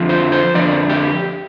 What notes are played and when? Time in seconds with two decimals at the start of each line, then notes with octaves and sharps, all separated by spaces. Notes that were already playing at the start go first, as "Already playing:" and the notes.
Already playing: F2 D3 F3
0.09 C5
0.32 C5
0.54 F2 D3 F3 D5
0.89 G4